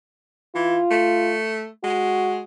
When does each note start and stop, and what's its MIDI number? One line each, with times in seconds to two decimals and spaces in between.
0.55 0.78 52
0.55 1.35 65
0.91 1.68 57
1.84 2.43 56
1.84 2.43 66